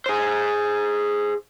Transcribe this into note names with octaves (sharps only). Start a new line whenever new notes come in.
G#4 C5